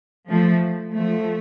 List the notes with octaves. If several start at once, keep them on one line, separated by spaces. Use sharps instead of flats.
F3 A3
F3 A3